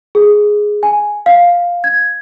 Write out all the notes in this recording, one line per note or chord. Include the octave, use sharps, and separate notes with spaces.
G#4
G#5
F5
G#6